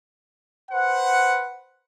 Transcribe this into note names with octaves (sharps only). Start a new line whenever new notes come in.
B4 C5 F#5